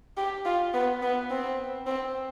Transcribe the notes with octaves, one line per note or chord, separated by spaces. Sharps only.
G4
F4
B3
B3
C4
C4